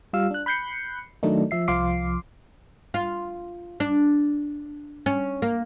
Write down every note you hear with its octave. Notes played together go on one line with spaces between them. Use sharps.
G3 F4 F5 E6
D4 F#6
B5 F#6 G6 C7 C#7
D#3 F#3 A3 D4 D#4
F3 E5 C7
C2 F3 F5 C6 D6 C7
F4
D4
C#4
A#3